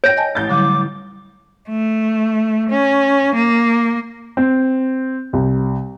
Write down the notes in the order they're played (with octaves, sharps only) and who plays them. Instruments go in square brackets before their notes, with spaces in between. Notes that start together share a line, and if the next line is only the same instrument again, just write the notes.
[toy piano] C#5 [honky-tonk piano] G5 A#6 D7
[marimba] D#5 G#5 A5
[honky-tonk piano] A1 G6 A6
[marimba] D3 F#3 G3 [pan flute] D6
[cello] A3
C#4
A#3
[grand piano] C4
C2